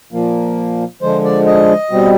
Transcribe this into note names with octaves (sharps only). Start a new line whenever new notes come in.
A#2 F3 A#3
D3 F3 G#3 C5
D5
D#5
B2 G3 C4